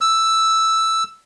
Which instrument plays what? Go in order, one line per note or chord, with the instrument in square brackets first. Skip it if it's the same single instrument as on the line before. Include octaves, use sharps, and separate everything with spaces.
[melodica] E6